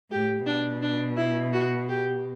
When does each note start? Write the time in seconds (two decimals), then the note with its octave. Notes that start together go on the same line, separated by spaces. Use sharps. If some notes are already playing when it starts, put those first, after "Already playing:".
0.11 A2 G4
0.46 B2 D4
0.82 D4
1.17 E4
1.53 F#4
1.89 G4